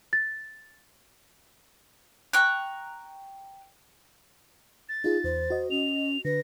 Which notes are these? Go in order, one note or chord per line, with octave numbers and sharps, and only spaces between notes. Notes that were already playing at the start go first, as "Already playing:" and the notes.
A6
G5 A#5 C#6 F#6
A6
D#4 F4 G#4
E2 C5
F#4 D#5
C#4 F7
D3 B4 A#6